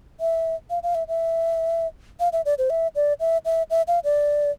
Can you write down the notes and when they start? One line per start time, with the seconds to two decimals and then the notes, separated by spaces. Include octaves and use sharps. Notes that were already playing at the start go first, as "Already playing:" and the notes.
0.20 E5
0.70 F5
0.83 F5
0.95 E5
1.08 E5
2.20 F5
2.33 E5
2.45 D5
2.58 C5
2.70 E5
2.96 D5
3.20 E5
3.45 E5
3.70 E5
3.88 F5
4.04 D5